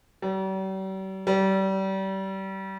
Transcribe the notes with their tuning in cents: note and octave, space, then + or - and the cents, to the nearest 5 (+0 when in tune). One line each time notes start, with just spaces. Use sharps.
G3 -45
G3 -30